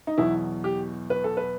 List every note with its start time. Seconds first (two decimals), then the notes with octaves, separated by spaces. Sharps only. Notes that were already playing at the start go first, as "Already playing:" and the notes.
0.07 D#4
0.18 E2 B2 F#3 E4
0.64 G4
1.10 B4
1.24 A4
1.37 B4